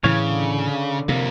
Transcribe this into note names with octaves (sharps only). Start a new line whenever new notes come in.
A2 C#3 E3 C#5 F5
D3
F2 C3 A#3